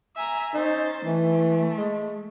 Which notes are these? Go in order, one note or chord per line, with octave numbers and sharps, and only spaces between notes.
E5 G#5 A#5
C#4 D#4 C5 A6
E3 A3
G#3